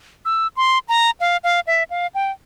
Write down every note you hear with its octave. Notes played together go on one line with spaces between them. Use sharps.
E6
C6
A#5
F5
F5
E5
F5
G5